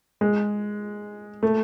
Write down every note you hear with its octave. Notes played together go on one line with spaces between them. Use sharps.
G#3
A3